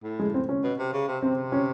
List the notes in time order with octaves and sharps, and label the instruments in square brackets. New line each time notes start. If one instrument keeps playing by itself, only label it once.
[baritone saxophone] A2
[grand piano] G#3
C4
C#4
[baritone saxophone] B2
C3
C#3
C3
[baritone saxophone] C3 [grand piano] C4
[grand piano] C#4